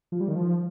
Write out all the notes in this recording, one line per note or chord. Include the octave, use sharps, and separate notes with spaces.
F3
G3
D#3
F3